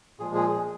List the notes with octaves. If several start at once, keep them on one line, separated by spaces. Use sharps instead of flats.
A#2 F3 G#3 G#4
G#4
G#4